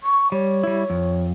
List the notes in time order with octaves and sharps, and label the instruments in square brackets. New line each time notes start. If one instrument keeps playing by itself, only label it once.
[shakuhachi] C#6
[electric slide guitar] G3 [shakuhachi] C#5
[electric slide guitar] G3 E4
F2